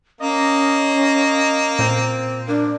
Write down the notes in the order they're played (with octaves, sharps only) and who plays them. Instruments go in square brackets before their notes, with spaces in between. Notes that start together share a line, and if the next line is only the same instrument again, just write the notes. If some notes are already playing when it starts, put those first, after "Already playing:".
[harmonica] A#3 [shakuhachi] C#4 [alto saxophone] D#5
[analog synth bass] A#2 [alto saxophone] C4
[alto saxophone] A#3 [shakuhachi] D4